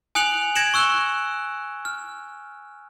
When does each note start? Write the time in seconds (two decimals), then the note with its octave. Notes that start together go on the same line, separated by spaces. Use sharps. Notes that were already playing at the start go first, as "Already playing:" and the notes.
0.15 G#5 D#6 F#6 C#7 F7 F#7
0.55 G#6 A#6 C#7 D7 E7 F#7
0.74 C#6 E6 F#6 G7
1.85 F6